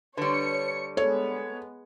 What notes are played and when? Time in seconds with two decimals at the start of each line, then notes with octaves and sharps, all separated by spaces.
0.17 D3 G3 B4 C#5 C#7
0.97 G#3 B3 A4 C#5